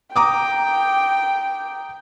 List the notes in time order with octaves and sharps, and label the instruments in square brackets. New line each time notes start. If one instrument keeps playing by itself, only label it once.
[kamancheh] G5 [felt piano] A#5 D6 D#6